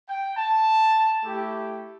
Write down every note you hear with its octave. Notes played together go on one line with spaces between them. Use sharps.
G5
A5
A3 E4 G4